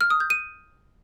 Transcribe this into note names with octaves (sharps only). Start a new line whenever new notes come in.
F6
D#6
G6
D#7